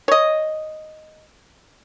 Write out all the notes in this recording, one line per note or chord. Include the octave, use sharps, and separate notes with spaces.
C#5 D#5